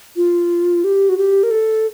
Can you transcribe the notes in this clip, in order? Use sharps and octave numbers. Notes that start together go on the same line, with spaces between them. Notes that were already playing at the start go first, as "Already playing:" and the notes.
F4
G4
F#4
G4
A#4
A4